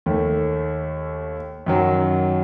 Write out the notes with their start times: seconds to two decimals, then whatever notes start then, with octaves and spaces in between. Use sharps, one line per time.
0.06 D#2 D#3 A3
1.66 F#2 D#3 F#3